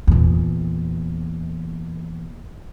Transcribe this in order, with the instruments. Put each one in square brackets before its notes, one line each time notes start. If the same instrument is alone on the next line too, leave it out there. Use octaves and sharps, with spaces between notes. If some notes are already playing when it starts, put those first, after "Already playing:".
[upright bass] E2 A#2